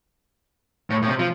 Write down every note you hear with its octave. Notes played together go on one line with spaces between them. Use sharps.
A2
A2
C3
F3